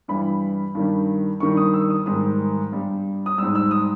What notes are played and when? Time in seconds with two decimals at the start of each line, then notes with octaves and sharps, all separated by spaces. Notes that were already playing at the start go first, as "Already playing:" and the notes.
0.08 G2 E3 G3 B5
0.75 G2 D#3 G3
1.40 G2 D#3 G3 C#6
1.57 D#6
1.74 E6
1.90 D#6
2.06 G#2 D#3 G3 D#6
2.72 G2 G3
3.26 D#6
3.38 G#2 G3 E6
3.55 E6
3.71 D#6